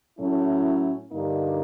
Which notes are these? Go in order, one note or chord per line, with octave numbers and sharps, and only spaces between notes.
A2 F#3 A3 C#4 E4
G2 D3 G3 A#3 D#4